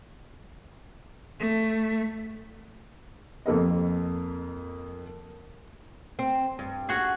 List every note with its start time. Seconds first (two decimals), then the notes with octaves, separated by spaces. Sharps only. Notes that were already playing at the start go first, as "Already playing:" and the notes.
1.39 A3
3.46 F2 A#3 A4 D#5
6.19 C4
6.59 G2
6.89 C#4 F#4 G#4